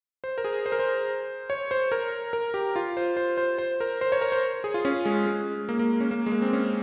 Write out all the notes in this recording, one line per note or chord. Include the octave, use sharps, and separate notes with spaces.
C5
A#4
G#4
C5
A#4
C5
C#5
C5
A#4
A#4
G4
F4
C5
C5
C5
C5
A#4
C5
C#5
A#4
C5
G#4
F4
C#4
G#3
G#3
A#3
A#3
C#4
A#3
G#3
A#3
C4
C#4